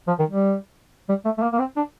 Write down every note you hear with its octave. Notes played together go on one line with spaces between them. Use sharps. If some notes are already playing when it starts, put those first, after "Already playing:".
F3
D#3
G3
G3
A3
A3
A#3
A#3
C4
D4